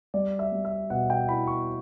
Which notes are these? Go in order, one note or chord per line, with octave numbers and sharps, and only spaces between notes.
G3 D5
E5
G3
E5
B2 F#5
G5
E4 B5
C#6